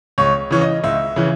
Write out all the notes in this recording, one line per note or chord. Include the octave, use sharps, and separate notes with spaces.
C#2 C#5
C#3 E3 C#5
D#5
C#2 E5
C#3 E3